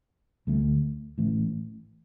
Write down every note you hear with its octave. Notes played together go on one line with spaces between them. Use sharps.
D2 D3 A3
A1 A2 E3 A3